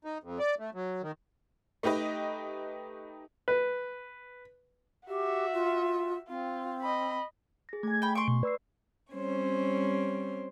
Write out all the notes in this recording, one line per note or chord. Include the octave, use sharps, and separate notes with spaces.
D#4
F2
D5
A3
F#3
D#3
A3 D#4 G4 B4 D#5
B4
F#4 G4 E5
F4
C4 F4
D#5 B5
G#4 A#6
A3 G#5 G#6
G5 B5
C6 C#6 D7
B2
B4 D5 E6 C7
G3 C4 C#4 C5 C#5